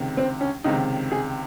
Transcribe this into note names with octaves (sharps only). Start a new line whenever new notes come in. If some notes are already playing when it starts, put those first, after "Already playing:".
Already playing: C#2 C3 D#3
C4
C#4
C#2 C3 D#3 D#4
G#4